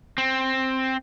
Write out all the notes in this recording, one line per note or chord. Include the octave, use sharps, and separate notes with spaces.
C4